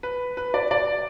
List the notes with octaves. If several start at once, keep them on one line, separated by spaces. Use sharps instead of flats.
B4
B4
D5
D5